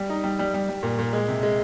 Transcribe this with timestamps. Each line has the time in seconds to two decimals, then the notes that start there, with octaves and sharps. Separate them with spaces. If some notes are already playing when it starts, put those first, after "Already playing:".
Already playing: G3
0.10 D#4
0.24 G3
0.39 G3
0.54 G3
0.69 G3
0.83 A#2
0.99 A#2
1.13 G#3
1.28 C3
1.43 G#3